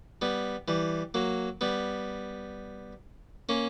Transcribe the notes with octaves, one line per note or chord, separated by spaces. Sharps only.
G3 B3
E3 G3
F#3 A#3
G3 B3
A#3 C#4